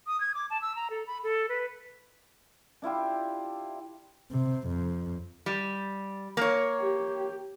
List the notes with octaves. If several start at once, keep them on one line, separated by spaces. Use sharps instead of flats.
D#6
G#6
D6
A5
E6
A#5
A4
B5
A4
B4
D4 E4 F4 G4
C3
F2
G3
A#3 C#5
G4